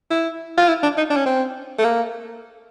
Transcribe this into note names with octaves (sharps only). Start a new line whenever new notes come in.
E4
F4
E4
D4
D#4
D4
C#4
C4
A3
A#3